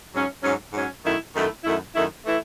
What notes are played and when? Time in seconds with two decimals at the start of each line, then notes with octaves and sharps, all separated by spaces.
0.13 G#2 F#3 C#4
0.42 G#2 F#3 C#4
0.73 G#2 F#3 C#4
1.04 F#2 D#3 A3 E4
1.34 F#2 D#3 A3 E4
1.64 F#2 D#3 A3 E4
1.94 F#2 D#3 A3 E4
2.26 E3 A3 E4